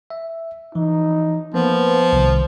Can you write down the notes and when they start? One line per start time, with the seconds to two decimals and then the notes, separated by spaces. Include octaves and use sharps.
0.10 E5
0.75 E3 F3 D#4
1.54 F3 A#3 B3
2.13 C2 D#3